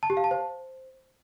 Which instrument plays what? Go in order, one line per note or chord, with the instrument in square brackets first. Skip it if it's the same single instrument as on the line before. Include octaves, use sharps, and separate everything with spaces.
[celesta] A5
G4
F5
A5
C5